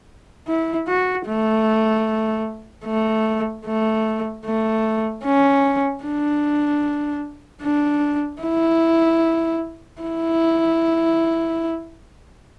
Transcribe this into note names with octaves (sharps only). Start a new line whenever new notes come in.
E4
F#4
A3
A3
A3
A3
C#4
D4
D4
E4
E4